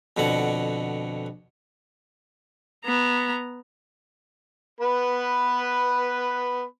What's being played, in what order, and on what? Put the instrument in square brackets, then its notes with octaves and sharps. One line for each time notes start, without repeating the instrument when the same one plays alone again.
[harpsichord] F2 B2 D3 F#5
[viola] B3 A#5
[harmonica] B3 B4 B5